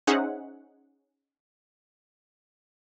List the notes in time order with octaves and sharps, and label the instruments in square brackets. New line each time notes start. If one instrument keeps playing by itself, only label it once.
[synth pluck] C#4 D#4 G#4 C5 E5 F#5